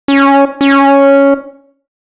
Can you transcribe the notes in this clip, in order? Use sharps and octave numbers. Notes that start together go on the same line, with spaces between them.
C#4
C#4